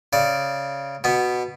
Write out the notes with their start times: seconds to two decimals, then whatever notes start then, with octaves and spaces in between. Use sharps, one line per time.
0.13 C#3 D5
1.04 B2 B3